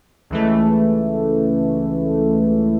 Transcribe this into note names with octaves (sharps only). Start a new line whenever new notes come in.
C#2 E3 A3